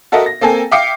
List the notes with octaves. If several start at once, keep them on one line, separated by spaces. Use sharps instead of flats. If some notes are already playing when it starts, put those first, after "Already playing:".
F#4 A4 A#4 D#5 E5 F#5
A#6
A#3 C4 A4 G5 G#5
E5 F5 G5 D6 C7 C#7